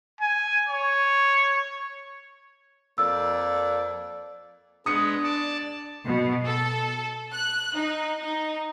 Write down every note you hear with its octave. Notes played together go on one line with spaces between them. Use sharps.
G#5
C#5
F2 A#3 D5 E6
G#3 B3 D4 D#6 C#7
D5 A5
B2
A4
F#6
D#4
D#4